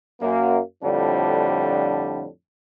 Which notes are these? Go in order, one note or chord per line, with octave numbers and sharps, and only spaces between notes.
F#2 A#3
F2 A2 D3 F3 G3 D4